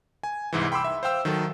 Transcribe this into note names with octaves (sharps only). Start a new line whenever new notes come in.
G#5
C2 G#2 E3
G5 B5 C6 D6 E6
E5
C5 F5 G5 E6
D#3 F#3 A4